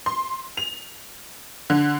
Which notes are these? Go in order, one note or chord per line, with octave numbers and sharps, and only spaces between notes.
C6
F7
D3